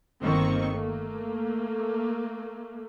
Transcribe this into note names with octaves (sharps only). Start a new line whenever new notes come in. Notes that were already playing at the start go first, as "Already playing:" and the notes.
G1 D#3 A#3 C4 C#6
A3 A#3